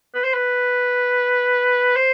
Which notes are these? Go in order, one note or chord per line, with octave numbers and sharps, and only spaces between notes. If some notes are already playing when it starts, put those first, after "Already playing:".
B4
C5
B4
C5